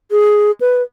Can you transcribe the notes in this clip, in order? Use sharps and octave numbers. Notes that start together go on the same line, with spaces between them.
G#4
B4